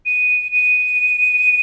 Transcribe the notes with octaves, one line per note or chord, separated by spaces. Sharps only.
D#7
D#7